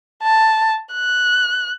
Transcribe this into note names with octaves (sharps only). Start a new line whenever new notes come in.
A5
F#6